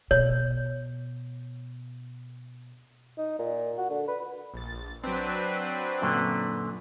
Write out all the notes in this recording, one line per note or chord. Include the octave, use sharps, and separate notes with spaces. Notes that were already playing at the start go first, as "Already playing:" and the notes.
B2 C#5
D#4
A#2
F#4
D3
B4
A#1 A6
F#3 C4 D4 B4
F#2 A#2 D3